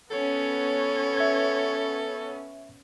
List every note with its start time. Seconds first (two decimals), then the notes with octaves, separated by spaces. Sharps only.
0.11 B3 C#4 A4 C#5
1.17 E5 G#6